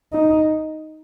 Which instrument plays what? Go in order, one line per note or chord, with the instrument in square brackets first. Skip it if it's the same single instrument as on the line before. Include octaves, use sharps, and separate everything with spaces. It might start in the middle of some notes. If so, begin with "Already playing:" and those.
[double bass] D#4